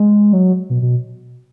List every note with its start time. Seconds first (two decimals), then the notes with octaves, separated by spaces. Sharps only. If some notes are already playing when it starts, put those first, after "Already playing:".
Already playing: G#3
0.33 F#3
0.70 B2
0.82 B2